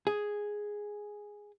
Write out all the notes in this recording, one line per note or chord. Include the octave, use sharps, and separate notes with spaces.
G#4